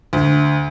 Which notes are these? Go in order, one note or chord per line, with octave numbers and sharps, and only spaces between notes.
D2